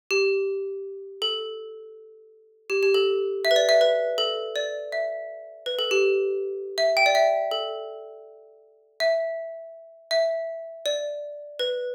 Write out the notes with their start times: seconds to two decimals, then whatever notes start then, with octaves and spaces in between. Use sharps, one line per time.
0.11 G4
1.22 A4
2.70 G4
2.83 G4
2.94 A4
3.45 E5
3.51 B4
3.56 D5
3.69 E5
3.81 B4
4.18 A4
4.56 D5
4.92 E5
5.66 B4
5.79 A4
5.91 G4
6.78 E5
6.97 G5
7.06 D5
7.15 E5
7.51 A4
9.00 E5
10.11 E5
10.86 D5
11.59 B4